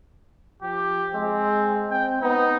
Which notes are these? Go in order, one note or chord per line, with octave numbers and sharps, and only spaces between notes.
F3 G4
G#3 C4
C4 G5
B3 D#4